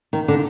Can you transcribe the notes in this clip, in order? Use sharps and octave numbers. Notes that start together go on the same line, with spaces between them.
D#3
D3